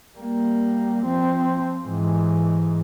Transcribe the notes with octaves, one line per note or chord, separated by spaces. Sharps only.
G3 A#3
F3 C4
G#2 E3